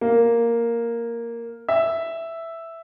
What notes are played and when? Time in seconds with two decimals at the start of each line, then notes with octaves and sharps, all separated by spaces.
0.01 A#3
1.69 E5